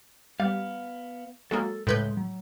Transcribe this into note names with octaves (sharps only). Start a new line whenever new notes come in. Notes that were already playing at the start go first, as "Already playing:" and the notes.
G3 B3 F5
F#3 G#3 A#3 A4
C#2 A2 G#3 B4 C6 G6
F#3